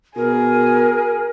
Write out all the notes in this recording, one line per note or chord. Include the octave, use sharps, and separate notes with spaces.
B2 G#4 A#4